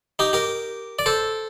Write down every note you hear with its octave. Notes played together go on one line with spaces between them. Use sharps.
D#4 G4
G4 A#4
D5
A4 C5